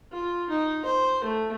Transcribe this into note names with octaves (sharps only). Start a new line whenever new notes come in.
F4
D#4
C5
A3